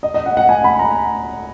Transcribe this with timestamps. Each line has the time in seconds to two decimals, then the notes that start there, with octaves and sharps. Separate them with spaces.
0.03 D#5
0.14 D#5
0.26 F#5
0.37 F#5
0.49 G#5
0.64 B5
0.79 A#5